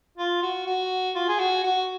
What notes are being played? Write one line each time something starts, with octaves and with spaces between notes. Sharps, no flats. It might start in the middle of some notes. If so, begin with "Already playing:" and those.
F4
F#4
F#4
F4
G#4
F#4
F#4